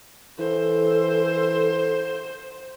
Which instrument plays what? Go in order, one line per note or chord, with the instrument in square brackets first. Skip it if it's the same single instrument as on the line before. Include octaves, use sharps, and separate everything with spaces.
[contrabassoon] E3 [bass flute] A4 [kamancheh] C5